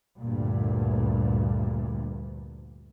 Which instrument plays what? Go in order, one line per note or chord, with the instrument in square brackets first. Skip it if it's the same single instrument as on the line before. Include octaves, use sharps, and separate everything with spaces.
[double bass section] D2 G2 A#2